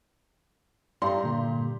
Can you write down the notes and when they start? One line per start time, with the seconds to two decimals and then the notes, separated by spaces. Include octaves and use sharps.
1.02 G2 G4 D5 A#5 C6
1.24 A#2 D3 A#3